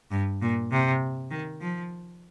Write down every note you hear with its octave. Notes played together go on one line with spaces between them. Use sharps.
G2
A#2
C3
D#3
F3